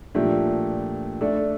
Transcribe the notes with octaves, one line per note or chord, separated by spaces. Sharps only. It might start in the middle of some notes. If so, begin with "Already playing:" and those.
A#2 F3 A3 D4 G4
A3 D4 A4 D5